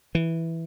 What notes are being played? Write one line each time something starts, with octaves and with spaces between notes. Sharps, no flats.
E3